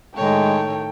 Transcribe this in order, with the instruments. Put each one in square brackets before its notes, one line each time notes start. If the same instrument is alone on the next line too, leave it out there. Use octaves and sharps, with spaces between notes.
[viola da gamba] A2 D#3 C#5 [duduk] G#3 [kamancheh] A4 G5